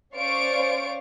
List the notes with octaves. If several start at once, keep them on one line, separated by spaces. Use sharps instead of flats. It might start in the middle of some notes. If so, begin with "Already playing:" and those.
C#4 C5 D5 F5 C#6 D7